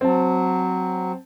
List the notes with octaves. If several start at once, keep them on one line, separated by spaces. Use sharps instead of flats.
F#3 C4 A5